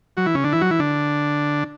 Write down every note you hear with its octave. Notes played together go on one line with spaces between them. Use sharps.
F#3 F#4
E3 E4
C#3 C#4
D3 D4
E3 E4
F#3 F#4
E3 E4
D3 D4